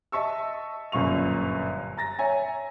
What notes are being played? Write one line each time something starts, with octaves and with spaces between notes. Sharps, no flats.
D#5 E5 A5 C#6 E6
G1 F#2 A#2 C#6 F7
A#5 A6 A#6
C#5 E5 G#5 A#5